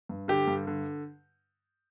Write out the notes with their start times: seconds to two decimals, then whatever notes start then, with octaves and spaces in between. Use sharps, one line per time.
0.09 G2
0.28 D3 G4
0.47 G2
0.67 D3